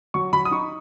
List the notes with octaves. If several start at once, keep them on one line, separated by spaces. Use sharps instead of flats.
F#3 C#6
F#3 B5
D#6
D#4 C#6